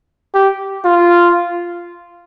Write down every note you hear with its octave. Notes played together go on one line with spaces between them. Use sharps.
G4
F4